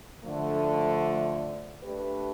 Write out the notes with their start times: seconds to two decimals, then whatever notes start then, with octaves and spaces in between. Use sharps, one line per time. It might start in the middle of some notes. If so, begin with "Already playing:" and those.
0.23 D3 F3 A3
1.84 A3 D4 G4 B4